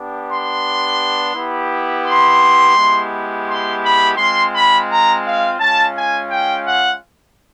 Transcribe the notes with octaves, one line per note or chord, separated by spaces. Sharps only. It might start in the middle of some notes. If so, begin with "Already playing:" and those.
Already playing: B3 D4 G4
C6
B3 E4 G4
C6
G#3 B3 E4 G4
C6
B5
G#3 C4 F4 C6
B5
A#5
F5
G#3 C#4 F4 A5
G#5
G5
F#5